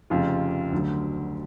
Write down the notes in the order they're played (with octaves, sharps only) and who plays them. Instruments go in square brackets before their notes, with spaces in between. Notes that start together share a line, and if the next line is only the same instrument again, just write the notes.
[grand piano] F1 F2 C#3 F4
D2 D3 F#3